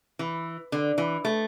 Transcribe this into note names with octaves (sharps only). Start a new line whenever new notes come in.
E3
D3
E3
A3